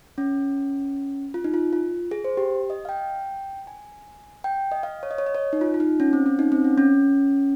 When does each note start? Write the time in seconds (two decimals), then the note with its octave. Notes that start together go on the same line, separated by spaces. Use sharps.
0.18 C#4
1.34 F4
1.44 D#4
1.54 F4
1.73 F4
2.11 G#4
2.24 C5
2.37 G4
2.70 D#5
2.85 F5
2.89 G5
3.67 G#5
4.44 G5
4.72 D#5
4.83 F5
5.03 C#5
5.11 D#5
5.18 C#5
5.26 D#5
5.35 C#5
5.53 D#4
5.61 F4
5.74 F4
5.80 D#4
6.00 C#4
6.13 C4
6.26 C#4
6.39 D#4
6.52 C4
6.64 C#4
6.78 C#4